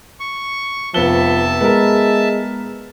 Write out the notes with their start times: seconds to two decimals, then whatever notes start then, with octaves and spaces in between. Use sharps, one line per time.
0.20 C#6
0.94 F1 F3 B3 E5 A5 G7
1.61 G#3 B3 A#4